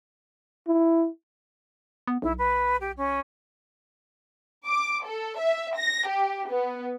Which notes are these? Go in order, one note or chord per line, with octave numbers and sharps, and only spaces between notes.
E4
B3
B1 E4
B4
G4
C#4
D6
A4
E5
A#6
G4
B3